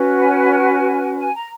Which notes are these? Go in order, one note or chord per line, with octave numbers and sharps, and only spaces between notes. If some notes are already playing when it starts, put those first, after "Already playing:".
Already playing: C#4 F#4 B4
G#5
G#5
A#5